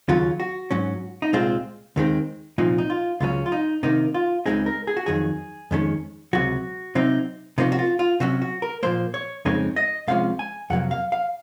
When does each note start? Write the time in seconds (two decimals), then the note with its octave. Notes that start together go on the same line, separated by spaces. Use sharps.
0.08 D#2 C#3 F#3 C#4 F4
0.40 F#4
0.71 G#2 F#3 C#4
1.22 D#4
1.33 C2 A#2 G#3 C4 F4
1.96 D#2 D#3 G#3 C4
2.58 C2 A#2 F3 C4 D#4
2.78 D#4
2.90 F4
3.20 C#2 C#3 F#3 C#4 F4
3.46 F4
3.52 D#4
3.83 C3 D#3 A#3 D#4
4.14 F4
4.46 C#2 C#3 G#3 C4 D#4 G#4
4.66 A#4
4.87 G#4
4.97 F#4
5.06 F2 D#3 F#3 G#4
5.71 F2 D#3 G#3 C#4
6.33 C#2 C3 F#3 F#4
6.95 C3 F#3 C4 D#4
7.58 C3 F3 A#3 C#4 D#4
7.72 F#4
7.79 F4
7.99 F4
8.20 C3 F#3 C#4 F#4
8.42 F#4
8.62 A#4
8.83 A#2 F3 A#3 C5
9.14 C#5
9.45 F2 C#3 G#3 C4 D#4 C#5
9.76 D#5
10.08 C2 C3 F3 G#3 C#4 F5
10.39 G#5
10.70 F2 C3 F#3 A#3 F#5
10.91 F5
11.12 F5